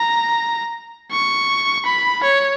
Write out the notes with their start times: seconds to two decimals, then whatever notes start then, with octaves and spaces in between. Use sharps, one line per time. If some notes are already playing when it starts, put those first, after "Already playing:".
Already playing: A#5
1.11 C#6
1.85 B5
2.23 C#5